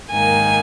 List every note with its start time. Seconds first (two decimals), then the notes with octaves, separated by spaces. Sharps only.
0.11 G#2 D#3 A#3 G#5